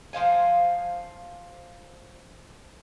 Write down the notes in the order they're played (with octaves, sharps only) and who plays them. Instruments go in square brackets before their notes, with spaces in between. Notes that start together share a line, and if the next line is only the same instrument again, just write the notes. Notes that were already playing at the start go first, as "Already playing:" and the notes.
[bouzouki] F3 C5 F5 G#5